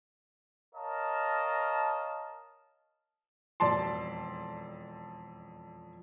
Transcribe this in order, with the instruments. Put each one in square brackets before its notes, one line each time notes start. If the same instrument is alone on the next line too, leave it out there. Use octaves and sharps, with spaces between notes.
[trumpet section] A#4 C#5 D#5 F5 A5
[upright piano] E1 F2 D5 A5 C6